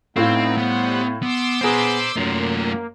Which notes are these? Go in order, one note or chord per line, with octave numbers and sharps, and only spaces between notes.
A2 B3 C4 D#4 E4 F5
G3 B3 C5 F#5
B3 C6 D6 E6
B3 G#4 C5 A#5
F#2 A3 A#3 F4